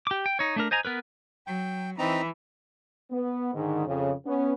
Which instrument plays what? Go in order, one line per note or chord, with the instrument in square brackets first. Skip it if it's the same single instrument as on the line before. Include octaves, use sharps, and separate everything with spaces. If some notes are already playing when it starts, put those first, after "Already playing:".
[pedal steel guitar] G4 D6
G5
D#4 C#5
A3 D4 A#4
C5 D#5 G#5 A#5
B3 A#4 B4
[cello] F#3 [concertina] G5
[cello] E3 [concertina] C4 D#4 A#5
[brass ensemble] B3
G#2 D3 D#3
F2 C#3
B3 C#4